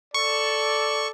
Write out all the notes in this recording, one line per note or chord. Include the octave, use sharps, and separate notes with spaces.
A4 D5 C#6